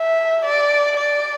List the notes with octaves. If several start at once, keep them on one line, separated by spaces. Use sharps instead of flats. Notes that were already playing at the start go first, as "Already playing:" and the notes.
Already playing: E5
D5
D5